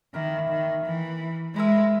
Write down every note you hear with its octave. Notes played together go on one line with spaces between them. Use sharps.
D#3 A#3 E4 A#4 E5
D#3
E3
G#3 E4 A#4 E5